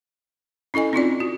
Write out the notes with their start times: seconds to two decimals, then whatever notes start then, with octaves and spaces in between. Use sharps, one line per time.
0.74 C#4 E4 A4 D#5 G#5
0.93 C4 D#4 F4 D5
1.20 F#4